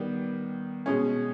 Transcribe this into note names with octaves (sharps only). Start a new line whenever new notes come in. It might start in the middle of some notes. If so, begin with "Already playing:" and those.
Already playing: D#3 G3 B3
B2 G#3 C#4